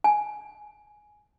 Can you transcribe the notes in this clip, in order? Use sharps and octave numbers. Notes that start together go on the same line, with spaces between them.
G#5